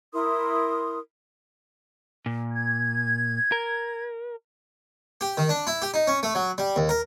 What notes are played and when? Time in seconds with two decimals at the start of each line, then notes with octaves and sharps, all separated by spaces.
0.13 E4 A#4 C6 D#6
2.26 A#2
2.51 G#6
3.52 A#4
5.21 G4
5.38 D#3
5.49 D4
5.67 E4
5.82 G4
5.94 D#4
6.07 C#4
6.23 A3
6.35 F#3
6.58 G3
6.76 D#2
6.89 A#4